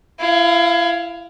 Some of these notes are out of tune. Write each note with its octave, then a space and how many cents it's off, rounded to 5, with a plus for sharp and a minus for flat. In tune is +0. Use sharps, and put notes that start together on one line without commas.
E4 +35 F5 +0